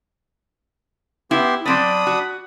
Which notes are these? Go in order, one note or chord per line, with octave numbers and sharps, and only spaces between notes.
B3 E4 G4 C6
F#3 C4 D4 D5 B5 D#6
F#4